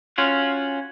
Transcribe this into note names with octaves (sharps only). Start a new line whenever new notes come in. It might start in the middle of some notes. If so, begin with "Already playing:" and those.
C#4 F4 F#4